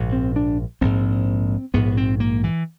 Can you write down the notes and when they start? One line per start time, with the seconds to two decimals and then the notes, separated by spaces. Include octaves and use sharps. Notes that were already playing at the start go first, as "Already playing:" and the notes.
Already playing: A#1 G#2
0.12 C4
0.36 D4
0.81 A#1 G#2 C4
1.74 A#1 G#2 B3
1.97 C4
2.20 A#3
2.44 E3